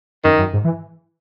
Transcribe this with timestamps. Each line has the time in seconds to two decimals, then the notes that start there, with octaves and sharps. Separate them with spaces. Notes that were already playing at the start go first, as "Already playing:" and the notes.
0.24 F#2 D#3
0.38 F#2
0.53 G#2
0.64 E3